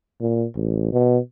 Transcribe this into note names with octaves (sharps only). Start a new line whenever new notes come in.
A#2
A1
B2